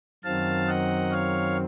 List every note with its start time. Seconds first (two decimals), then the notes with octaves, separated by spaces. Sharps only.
0.24 F#2 D#3 F#3 C4 F5 A5
0.68 D#5 F#5
1.12 C#5 F5